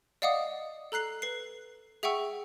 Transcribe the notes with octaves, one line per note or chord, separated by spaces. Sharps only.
D5 D#5 F5 F#5 D6 D#6
A4 A#5 F#6 C7 F#7
B4 C7
G#4 E5 F#5 G5 C#6 E6